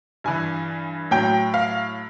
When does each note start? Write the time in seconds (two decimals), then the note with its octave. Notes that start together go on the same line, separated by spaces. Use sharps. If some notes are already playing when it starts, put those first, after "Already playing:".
0.24 G2 E3 G#5
1.11 A2 F#3 G5
1.54 F5